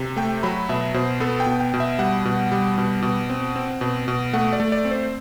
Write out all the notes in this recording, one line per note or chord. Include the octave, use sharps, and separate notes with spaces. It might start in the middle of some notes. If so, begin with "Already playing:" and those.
Already playing: C3
A3 G5
F#3 B5
B2 E5
B2 C5
B3 A4
G5
B2
G5
B2
E5
G3 F#5
B2
G3
B2
B2
C4
C4
B2
B2
A3 F#5
D5
A3
D5
C4
C5